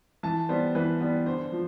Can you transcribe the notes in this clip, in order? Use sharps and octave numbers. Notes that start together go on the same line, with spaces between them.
E3 A5
G3 B3 C5
E3 B4
G3 B3
D3 C5
F3